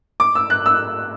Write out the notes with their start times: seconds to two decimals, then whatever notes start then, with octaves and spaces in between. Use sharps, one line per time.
0.20 D6
0.35 E6
0.50 F#6
0.66 E6